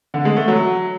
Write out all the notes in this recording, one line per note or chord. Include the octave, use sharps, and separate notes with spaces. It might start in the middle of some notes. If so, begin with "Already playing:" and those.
D3
G#3
A3
F#3